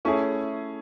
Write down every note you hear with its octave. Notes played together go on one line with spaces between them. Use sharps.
A3 C#4 E4 G#4